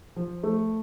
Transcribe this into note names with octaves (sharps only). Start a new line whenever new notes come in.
F3
A3